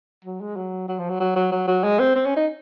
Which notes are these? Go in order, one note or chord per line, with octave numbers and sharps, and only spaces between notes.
F#3
G#3
F#3
F#3
F3
F#3
F#3
F#3
F#3
F#3
G#3
C4
C4
C#4
D#4